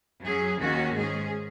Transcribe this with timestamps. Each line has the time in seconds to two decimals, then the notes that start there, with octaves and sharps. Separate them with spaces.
0.22 F#2 F#3 C#4 G#4
0.59 D#2 D#3 A#3 C#4 F#4
0.95 G#2 G#3 C#4 G#4